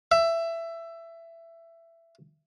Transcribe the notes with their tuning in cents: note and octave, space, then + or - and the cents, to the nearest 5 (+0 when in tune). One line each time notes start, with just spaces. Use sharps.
E5 +15